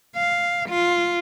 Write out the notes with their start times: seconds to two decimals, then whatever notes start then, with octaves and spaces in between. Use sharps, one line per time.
0.16 F5
0.70 F4